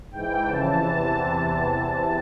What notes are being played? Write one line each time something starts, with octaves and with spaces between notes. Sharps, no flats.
G#2 E3 G5
F2 C#3 E3 A5
E2 C3 E3